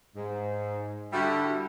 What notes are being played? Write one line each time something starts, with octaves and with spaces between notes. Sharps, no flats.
G#2
D3 G3 E4 F#4 G4 A4